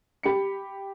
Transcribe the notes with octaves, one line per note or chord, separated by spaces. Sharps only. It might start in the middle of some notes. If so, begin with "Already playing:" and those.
G4 B5 C#7